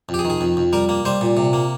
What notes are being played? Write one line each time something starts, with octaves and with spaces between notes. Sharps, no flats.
F2
G4
G#4
D#3
G#4
F2
F2
G3 A#4
A#3
G3 C5
A#2
C3
A#3